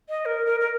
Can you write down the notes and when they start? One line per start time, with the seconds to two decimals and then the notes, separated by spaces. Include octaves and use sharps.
0.09 D#5
0.25 A#4
0.46 A#4
0.60 A#4